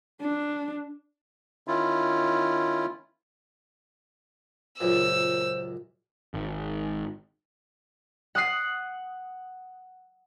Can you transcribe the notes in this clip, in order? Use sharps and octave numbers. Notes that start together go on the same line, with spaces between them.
D4
D#3 C#4 E4 F4
C#2 F#2 A#2 C5 E6
G#1
F#5 D#6 F#6 C7